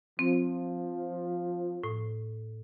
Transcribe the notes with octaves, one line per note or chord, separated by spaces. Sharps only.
F3 C4
A2